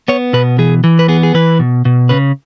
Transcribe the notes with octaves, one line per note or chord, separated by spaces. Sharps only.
B3 C#5
B2 B4
E3 G#4
E3
B4
B3 G#4
G#4
E3 B4
B2
B2
C#3 B4